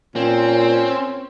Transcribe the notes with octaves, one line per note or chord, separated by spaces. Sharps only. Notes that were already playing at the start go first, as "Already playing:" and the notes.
A#2 C4 C#4